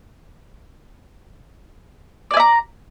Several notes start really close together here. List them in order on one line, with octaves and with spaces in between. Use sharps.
D5 G#5 E5 A#5